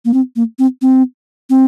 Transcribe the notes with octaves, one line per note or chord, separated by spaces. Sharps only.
A#3
C4
A#3
C4
C4
C4